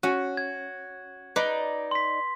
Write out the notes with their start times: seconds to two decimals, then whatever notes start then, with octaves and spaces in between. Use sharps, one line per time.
0.03 C#4 F#4
0.37 G#6
1.36 D#4 B4 D5
1.91 C6 B6